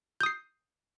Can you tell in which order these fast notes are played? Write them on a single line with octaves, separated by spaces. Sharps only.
G6 D#6 C7